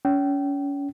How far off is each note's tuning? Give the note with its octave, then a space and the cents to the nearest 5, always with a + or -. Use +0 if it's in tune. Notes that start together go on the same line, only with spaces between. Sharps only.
C#4 +30 G5 -30